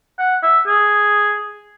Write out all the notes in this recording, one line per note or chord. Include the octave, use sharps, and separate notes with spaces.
F#5
E5
G#4